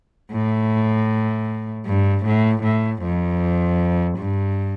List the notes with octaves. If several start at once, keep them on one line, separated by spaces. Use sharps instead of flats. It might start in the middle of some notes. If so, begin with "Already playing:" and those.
A2
G2
A2
A2
F2
G2